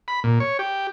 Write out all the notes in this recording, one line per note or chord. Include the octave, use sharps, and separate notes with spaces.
B5
A#2
C#5
G4